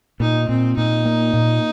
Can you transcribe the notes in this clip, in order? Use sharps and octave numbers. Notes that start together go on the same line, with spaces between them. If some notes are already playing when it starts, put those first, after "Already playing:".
A#2 D#4
A#2 C4
A#2 D#4
A#3
A#2